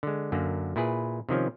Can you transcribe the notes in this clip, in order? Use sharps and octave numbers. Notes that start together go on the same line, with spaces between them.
D3 G#3
F#2 D3 A#3
A#2 E4 G#4 B4
C3 D#3 F3 C#4